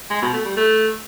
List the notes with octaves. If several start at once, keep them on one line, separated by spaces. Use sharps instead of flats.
G#3
B2
A3
G3
A3